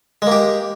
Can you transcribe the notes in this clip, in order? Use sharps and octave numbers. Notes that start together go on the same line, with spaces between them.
G#3 A#3 G4